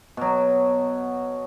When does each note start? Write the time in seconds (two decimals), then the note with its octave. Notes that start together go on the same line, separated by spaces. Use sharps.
0.17 B2 F#3